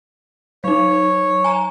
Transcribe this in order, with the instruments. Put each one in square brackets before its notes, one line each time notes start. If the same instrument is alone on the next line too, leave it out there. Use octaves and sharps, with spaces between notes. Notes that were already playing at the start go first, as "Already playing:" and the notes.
[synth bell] F#3 D#4 [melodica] C#5
[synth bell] G#5 A#5